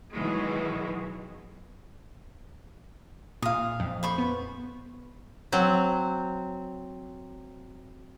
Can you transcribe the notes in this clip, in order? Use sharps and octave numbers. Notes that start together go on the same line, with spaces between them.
B2 D#3 E3 F#3 G#3
A#2 F5 D#6
F2
C5 B5 C#6
B3
F#3 C4